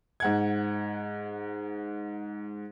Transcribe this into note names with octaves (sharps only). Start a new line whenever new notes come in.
G#2 F#5 G#6